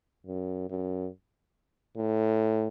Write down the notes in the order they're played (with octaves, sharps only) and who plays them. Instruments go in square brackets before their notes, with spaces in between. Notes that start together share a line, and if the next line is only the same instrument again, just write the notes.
[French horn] F#2
F#2
A2